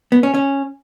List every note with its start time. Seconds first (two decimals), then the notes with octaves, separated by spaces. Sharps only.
0.12 B3
0.23 C#4
0.34 C#4